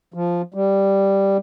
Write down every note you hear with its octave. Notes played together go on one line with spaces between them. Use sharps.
F3
G3